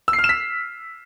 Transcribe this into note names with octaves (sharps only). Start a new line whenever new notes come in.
E6
C7
F6
E7
B6